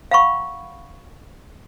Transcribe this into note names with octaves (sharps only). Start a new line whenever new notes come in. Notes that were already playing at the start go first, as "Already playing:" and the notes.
F5 F#5 B5 C#6